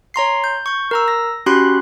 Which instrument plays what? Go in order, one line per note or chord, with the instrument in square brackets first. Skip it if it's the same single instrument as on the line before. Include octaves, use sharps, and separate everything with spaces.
[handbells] C#5 A#5 C6 C7
G6
C#6 G6
A#4 A#5 E6
A#6
C#4 F#4 G4 B5 C6 F#6